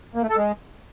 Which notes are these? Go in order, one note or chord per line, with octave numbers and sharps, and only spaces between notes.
A#3
A3
A4
G#3